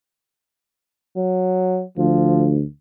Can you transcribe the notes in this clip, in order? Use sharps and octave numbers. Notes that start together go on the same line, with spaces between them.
F#3
D2 F3